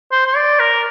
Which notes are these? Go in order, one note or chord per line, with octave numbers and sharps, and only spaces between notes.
C5
C5
D5
A#4